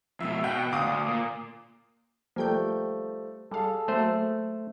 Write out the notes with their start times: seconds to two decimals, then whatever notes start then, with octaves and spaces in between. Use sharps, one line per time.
0.20 F2 B2 E5
0.44 B2 F#5 G5
0.72 D2 F5 D6 D#6
0.86 D2
1.08 A#2
2.36 F3 G3 A3 A#3 G5 G6
3.52 G3 G#4 A4 F5
3.88 F#3 A3 A#3 C5